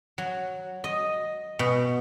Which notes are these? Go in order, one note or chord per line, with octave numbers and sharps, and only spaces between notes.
F#3
D#5
B2